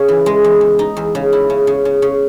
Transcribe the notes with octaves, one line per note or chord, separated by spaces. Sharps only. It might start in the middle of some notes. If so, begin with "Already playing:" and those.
Already playing: C#3 C#4
E3
G#3
E2
E2
D#4
E2
C#3
E4
C#3
C#3
C#3
C#3